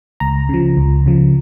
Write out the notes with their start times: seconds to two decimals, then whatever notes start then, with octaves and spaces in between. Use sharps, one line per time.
0.20 C#2 A#5
0.49 C#3 F3
0.77 C#2
1.06 C#3 F3